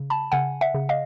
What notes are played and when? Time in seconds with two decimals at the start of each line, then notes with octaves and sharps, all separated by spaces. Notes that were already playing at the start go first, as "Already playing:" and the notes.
Already playing: C#3
0.10 A5 B5
0.32 C#3 F#5 G#5
0.61 E5 F#5
0.74 C#3
0.89 D#5 F5